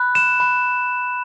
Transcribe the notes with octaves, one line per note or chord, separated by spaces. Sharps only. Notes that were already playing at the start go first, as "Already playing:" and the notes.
Already playing: B5 F#6
E7
B5 F#6